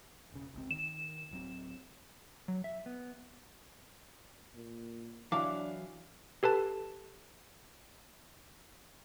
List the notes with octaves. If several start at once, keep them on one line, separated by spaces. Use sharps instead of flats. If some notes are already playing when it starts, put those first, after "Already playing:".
E1 C#3
G#1 C#2 C4
D#3 E7
D1 F#3 C4
F#3
E5
B3
A#2
E3 F#3 D4 E4 F5 D6
G4 A4 B4 A5